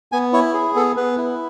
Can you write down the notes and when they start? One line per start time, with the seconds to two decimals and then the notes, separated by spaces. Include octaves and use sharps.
0.12 B3 G#5
0.33 E4 C#5
0.54 G#4
0.76 B3 A4
0.97 B3 B4
1.17 E4